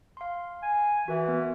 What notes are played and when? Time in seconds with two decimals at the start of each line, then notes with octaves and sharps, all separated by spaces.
0.17 F5 C6
0.63 G#5
1.08 E3 F#4 A#4 E5
1.28 B3